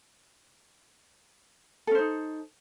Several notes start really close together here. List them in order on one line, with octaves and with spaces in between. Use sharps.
A4 C#4 C5 D#4